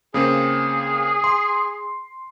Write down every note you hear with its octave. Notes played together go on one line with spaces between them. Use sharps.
C#3 A#3 C4 G#4
C6